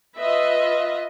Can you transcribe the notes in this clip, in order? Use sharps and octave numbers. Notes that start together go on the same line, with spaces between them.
F4 B4 D#5 E5